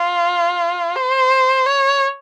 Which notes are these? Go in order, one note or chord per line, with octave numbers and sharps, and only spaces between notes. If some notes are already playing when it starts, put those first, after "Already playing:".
Already playing: F4
C5
C#5